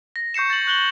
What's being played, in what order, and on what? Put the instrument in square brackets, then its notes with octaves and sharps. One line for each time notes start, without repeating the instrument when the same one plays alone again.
[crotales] A#6
C#6 G6 C7 C#7 E7
A6 F#7
F#6 F#7 G7